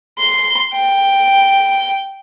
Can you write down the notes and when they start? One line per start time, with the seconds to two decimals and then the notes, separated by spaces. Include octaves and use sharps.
0.19 C6
0.73 G5